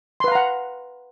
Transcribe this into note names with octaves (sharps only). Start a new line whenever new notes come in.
B4 F5 F#5 A#5 C6